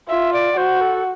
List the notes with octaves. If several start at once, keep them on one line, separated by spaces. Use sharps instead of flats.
F4 E5
D5
F#4 C5
A4